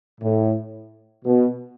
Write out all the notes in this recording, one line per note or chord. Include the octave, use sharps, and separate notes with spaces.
A2
B2